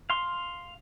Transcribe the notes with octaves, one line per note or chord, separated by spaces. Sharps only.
F5 C6